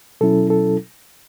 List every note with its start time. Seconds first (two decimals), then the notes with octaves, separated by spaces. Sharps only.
0.21 B2 F#3 C#4 E4 A4
0.50 A4